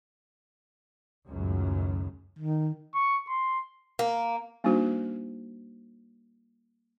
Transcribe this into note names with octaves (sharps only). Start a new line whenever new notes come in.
C#2 F#2 A2 D#3 F#3
D#3
C#6
C6
A#3
G3 A#3 D4 D#4 F#4 C5